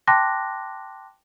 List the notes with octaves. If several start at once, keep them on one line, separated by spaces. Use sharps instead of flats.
G5 A5 C6 D6 F#6 A#6